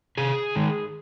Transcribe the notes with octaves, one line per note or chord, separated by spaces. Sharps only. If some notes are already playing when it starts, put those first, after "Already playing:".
C3 G#4
D#3 G#3